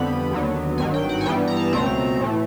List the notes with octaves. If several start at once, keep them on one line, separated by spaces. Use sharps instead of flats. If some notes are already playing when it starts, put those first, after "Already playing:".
Already playing: F2 D3 G3 B3 B5
D#2 D3 F#3 B3
G#1 G2 D#3 F#3 G#5
G5
F#5
G#5
G2 E3 G3 B3 G5
A#5
A5
C#2 B2 F#3 A3 C4 A#5
A2 E3 A3